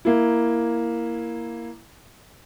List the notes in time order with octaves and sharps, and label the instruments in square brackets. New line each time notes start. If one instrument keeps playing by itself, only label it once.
[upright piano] A#3 E4